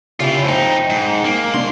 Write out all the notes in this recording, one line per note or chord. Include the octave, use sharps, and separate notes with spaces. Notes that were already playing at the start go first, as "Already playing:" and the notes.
C#3 E4 F4 G4 E5
F2 D#4 C5 G5
G#2
A#3
F#2 G#3 D4 F#4 C6